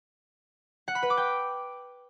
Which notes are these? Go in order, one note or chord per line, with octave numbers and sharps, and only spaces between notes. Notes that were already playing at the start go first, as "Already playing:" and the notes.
F#5
B5
B4
D6
G5